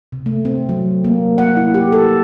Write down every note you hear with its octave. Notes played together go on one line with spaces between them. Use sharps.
C3
A3
C4
F#3
A#3
F#5
E4
G4
A4